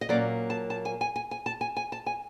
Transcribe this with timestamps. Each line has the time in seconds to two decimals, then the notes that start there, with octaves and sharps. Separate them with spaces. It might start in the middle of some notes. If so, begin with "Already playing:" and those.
0.01 D#5
0.09 A#2 F#3 A#3 C#4 D5
0.50 A5
0.70 A5
0.85 G#5
1.01 G#5
1.16 G#5
1.31 G#5
1.46 A5
1.61 G#5
1.77 G#5
1.92 A5
2.06 G#5